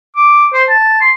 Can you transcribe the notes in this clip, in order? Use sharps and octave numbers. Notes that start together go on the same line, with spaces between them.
D6
C5
A5
C6